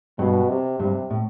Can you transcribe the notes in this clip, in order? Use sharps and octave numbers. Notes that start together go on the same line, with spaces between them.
G2 B2
C3
G2 C3
A2